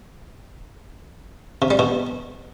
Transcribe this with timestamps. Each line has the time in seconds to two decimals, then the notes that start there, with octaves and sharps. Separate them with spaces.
1.62 C3
1.70 G3
1.79 B2